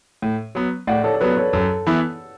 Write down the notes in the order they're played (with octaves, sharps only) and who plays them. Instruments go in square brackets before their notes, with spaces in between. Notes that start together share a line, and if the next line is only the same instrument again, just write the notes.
[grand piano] A2
F#3 B3
[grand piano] A2 [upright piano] D5 F#5
[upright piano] A4 C#5
A4
[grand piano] F#3 B3 [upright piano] B4
[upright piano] A4 C#5
[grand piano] F#2 [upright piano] A4
[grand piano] E3 B3 E4